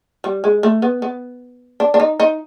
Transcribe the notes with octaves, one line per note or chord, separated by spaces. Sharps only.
G3
G#3
A3
B3
B3
D4
D4
D#4
D#4